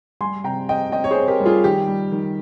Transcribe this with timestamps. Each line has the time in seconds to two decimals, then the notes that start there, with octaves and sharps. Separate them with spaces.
0.21 G3 G#5 C6
0.44 C3 G5 A#5
0.69 C4 D#5 G5
0.92 C4 D#5 G5
1.04 C#5
1.11 G#4 C5
1.17 C4
1.28 G4 A#4
1.40 G3
1.46 F4 G#4
1.64 D#3 G4
1.88 G3
2.12 D#3